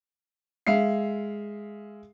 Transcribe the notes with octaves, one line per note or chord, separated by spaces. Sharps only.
G#3 E5 F5 C7